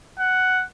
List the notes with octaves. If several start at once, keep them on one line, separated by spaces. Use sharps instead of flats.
F#5